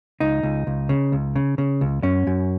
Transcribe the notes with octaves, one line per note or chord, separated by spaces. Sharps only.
C#2 D#4
C#2
C#2
C#3
C#2
C#3
C#3
C#2
F#2 C#4
F#2